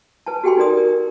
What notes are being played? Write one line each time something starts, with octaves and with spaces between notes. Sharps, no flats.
B4 G#5 A5
F#4 G4 A4 G5 G#5 C6
D#4 A#4 D5 D#6
A#4